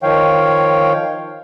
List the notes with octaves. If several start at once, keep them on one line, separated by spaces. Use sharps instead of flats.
D#3 F3 C#5 F5 G5